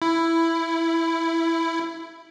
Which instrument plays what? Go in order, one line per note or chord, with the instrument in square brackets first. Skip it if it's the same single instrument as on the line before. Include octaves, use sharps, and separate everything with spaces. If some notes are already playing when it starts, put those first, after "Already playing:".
[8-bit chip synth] E4